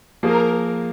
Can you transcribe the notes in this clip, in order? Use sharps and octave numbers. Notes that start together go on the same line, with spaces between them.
F3 A#3 G#4 A#4